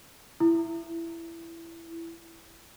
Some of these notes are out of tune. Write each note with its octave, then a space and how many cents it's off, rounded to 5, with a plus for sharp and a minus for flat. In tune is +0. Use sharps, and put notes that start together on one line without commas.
E4 +15